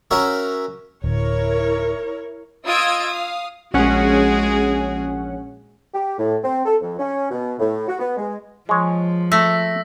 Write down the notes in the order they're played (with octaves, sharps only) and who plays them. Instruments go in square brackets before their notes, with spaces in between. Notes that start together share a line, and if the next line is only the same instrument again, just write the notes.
[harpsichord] C#4 F#4 A#4 C#5 E5
[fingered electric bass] D1 [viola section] E4 A#4 C#5
[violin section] F4 D#5 D#6 E6 G#6 D7
F5 D#6
[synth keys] A#1 C#4 F#5 [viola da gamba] G#3 F#4 G#4
[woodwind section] G4
A2
C4
A4
F2
C#4
B2
A2
F#4
B3
G#3
[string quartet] F3 [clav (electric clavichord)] G#3 C#5
[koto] A3 [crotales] E6 A#6 B6